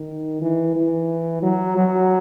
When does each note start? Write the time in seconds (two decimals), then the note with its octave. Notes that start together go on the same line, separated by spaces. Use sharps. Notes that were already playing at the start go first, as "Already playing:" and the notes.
Already playing: D#3
0.42 E3
0.76 E3
1.43 F#3
1.77 F#3